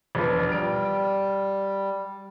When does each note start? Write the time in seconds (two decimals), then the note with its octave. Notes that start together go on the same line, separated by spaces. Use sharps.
0.15 E1 F3 B4
0.47 G3 F6 D7